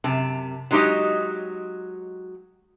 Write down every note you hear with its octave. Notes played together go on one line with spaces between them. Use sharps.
F#2 C3 A5
F#3 G#3 D#4 G4 C#5 D#5